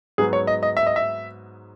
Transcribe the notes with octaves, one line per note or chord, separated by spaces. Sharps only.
G#2 F#3 B3 G#4
C#5
D#5
D#5
E5
D#5
E5